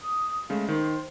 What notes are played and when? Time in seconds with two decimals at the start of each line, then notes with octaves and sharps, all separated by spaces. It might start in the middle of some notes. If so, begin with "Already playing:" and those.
0.02 D#6
0.50 C#3 G#3 A3 F5
0.68 D#3 C5